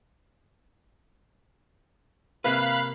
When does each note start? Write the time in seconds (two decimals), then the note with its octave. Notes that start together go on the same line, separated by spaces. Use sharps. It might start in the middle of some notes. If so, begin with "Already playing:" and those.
2.44 C3 A#3 B4 F5 B5 F#6